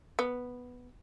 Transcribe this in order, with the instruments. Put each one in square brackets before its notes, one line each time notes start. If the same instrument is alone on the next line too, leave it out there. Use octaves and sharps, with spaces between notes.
[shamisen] B3